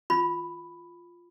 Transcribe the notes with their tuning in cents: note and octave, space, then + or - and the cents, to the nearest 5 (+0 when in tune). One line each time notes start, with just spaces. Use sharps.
F4 +0 B5 +5